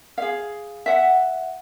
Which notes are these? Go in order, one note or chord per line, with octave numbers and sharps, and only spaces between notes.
G#4 F5
E5 F#5